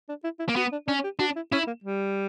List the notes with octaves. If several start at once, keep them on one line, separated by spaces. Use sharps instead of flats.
D4
E4
E4
A#3
B3 F#4
D4
C#4 D4
G4
D4 F#4
E4
C#4 E4
A#3
G3